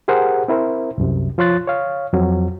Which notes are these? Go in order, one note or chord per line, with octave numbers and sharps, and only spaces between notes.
G4 G#4 A#4 C5 F#5
C4 E4 A#4 C5
C2 F#2 C3
F3 F4 C#5 C6 F#6 A6
C#5 F5
F2 F#3 C4